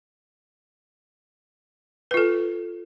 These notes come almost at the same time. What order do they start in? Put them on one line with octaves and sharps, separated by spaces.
B4 F4 A4